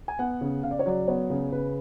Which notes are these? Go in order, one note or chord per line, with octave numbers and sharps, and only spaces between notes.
G#5
B3 F#5
C#3
C#3 F5
D5
C#5
F#3 D5
B3 C#5
C#3
C#3 B4